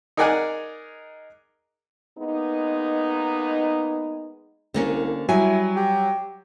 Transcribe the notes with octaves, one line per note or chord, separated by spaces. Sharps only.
D#4 G#4 A#4 D5 F#5 G#5
G#3 A#3 B3 D#4
C2 D3 A#3 C#4
F#3 G3 E4 G#5
G4